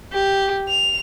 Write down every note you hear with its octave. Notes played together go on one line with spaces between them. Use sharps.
G4
F7